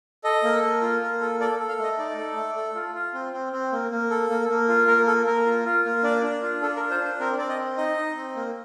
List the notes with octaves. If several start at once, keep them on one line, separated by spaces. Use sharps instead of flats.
A4 D#5
A#3
A#3
F4
A#3
A4
A4 D5
A4
F5
A3 D#5
D#4 D5
A4
A3
A4
F4
F4
C4
C4
C4
A#3
A#3
A4
A#3
A#3
F4
A#3 A#4
A4
A#3 A#4
F4
F4
A#3
D4 D5
D4
F4
D4 A4
A#4
F4
C5
D4 C5
C4 A#4
C4 D5
D#5
C4
D#4 D#5
D#4
C4
A#3